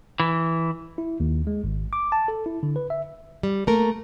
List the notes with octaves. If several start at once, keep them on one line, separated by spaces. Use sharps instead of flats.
E3
E4
D#2
G#3
G#1
D6
A5
A4
E4
D3
B4
E5
G3
A3 A#3 A#4